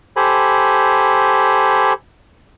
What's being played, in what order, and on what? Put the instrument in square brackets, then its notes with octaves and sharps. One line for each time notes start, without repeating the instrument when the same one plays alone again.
[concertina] G4 A4 C5 G#5 B5